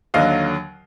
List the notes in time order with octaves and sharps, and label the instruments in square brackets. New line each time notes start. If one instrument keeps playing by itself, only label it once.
[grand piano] D#2 D3 F#3 D#5 F5